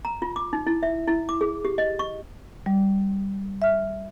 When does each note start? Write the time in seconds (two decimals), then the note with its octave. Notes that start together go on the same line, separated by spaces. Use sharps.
0.05 A#5
0.22 F4
0.36 D6
0.53 D#4
0.67 E4
0.83 E5
1.07 E4
1.29 D6
1.41 G#4
1.65 G4
1.78 D#5
1.99 C#6
2.66 G3
3.62 E5 F6